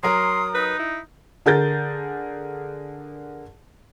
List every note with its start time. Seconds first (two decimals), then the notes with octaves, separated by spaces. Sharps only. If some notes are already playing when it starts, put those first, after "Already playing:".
0.03 F#3 A#4 C6 D#6
0.55 D#4 B4
0.79 E4
1.46 D3 G#4 A#4 G6 A6